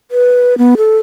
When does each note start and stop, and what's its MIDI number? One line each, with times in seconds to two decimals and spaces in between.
0.11 0.57 71
0.58 0.74 59
0.77 0.99 69